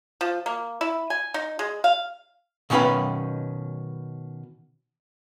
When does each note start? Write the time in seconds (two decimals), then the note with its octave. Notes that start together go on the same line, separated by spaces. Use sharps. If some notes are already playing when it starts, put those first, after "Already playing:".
0.21 F3
0.46 A#3
0.81 E4
1.10 G#5
1.34 D#4
1.59 G#3
1.84 F5
2.70 B2 D#3 C#4 F4 B4 F5